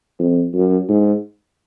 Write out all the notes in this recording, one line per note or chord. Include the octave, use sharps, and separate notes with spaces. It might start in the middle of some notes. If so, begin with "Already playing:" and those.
F2
F#2
G#2